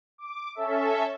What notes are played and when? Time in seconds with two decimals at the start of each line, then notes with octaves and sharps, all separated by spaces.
0.18 D6
0.55 C#4 A4 E5